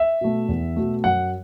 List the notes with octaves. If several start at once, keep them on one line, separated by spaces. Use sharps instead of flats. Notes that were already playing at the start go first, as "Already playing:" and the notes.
Already playing: E5
B2 A3
E2
B2 A3
F#2 F#5